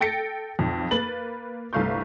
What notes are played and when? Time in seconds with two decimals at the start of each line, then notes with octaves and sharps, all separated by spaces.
0.01 A4 G5 A6 A#6 C#7
0.59 B1 F2
0.91 A#3 B4 A6 F#7
1.73 G1 C2 A3 F5 C#6 G6